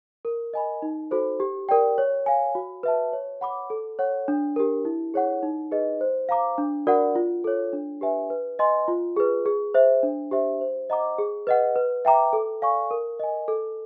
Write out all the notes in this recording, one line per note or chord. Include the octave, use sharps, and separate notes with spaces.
A#4
D#5 G#5 B5
D#4
F#4 A4 C5
G4
A#4 D5 G5
C#5
F5 G#5
F#4
B4 E5 A5
C#5
F#5 B5 D6
A4
C#5 F#5
D4
G4 A#4
E4
G#4 C#5 F#5
D#4
G#4 B4 D#5
C5
F5 A#5 D6
D4
F#4 A#4 D5 F#5
F4
A4 C#5
D4
G4 B4 E5 G#5
B4
D#5 G#5 C6
F4
G#4 B4
G#4
C5 E5
D4
G4 C5 E5
C5
D#5 F#5 A#5 D6
G#4
B4 D#5 F#5
B4
E5 G5 A#5 D6
A4
D5 F5 G#5 C#6
A#4
D#5 G#5
A4